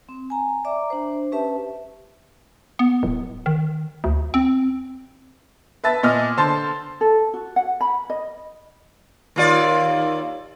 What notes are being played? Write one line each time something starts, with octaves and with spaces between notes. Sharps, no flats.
C4
G#5 A#5
D5 E5 A#5 D6
D4 C5
C#4 G4 B4 E5 A5
B3
D1
D#3
D2
C4
B4 E5 A5 A6
A#2 D#5 G#5 E6 F6
D3 C5 A5 C6 A6
A4
F#4
F#5
B5
D#5
D#2 F4 D5